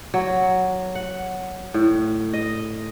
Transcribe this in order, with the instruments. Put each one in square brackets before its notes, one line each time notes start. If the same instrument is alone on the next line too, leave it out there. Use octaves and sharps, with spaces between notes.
[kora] F#3
F#5
A2
D#5